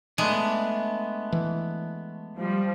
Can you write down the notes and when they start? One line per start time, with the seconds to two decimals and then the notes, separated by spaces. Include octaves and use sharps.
0.18 G#3 A3 B3 D4
1.32 E3
2.38 F3 G3